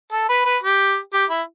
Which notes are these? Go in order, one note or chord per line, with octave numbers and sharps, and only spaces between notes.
A4
B4
B4
G4
G4
E4